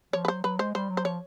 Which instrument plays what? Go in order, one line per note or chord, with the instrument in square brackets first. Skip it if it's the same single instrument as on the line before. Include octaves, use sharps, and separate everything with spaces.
[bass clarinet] F3 [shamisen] C#5
[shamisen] B4
[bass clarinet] F#3 [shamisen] C5
[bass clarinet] F#3 [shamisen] B4
[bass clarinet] G#3 [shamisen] C5
[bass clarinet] G3 [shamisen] C5
[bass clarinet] F#3
[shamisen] C5
[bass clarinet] F3 [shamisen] C#5